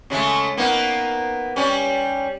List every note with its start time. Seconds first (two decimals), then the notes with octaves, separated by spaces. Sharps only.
0.10 C#3 G#3 A3
0.57 A#3 B3 D#4
1.56 G3 C#4